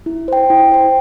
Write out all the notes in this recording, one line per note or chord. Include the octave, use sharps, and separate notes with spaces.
E4
C5 G5
E4
C5 G5